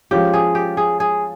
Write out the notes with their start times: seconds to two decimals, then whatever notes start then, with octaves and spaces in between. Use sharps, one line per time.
0.11 F3 G#3 C#4 F4 G4
0.33 G#4
0.55 G4
0.77 G#4
1.00 G#4